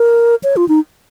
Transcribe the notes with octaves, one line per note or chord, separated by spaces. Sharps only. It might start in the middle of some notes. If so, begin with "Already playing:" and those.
Already playing: A#4
C#5
F4
D#4